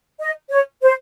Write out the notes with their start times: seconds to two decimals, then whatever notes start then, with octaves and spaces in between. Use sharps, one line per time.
0.21 D#5
0.51 C#5
0.82 C5